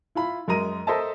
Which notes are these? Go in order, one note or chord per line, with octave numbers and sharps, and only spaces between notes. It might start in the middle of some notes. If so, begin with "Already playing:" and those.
E4 F4 B5
F#2 G#3 A#4 D#5 A#5 D#7
A4 A#4 C5 D#5 E5 A5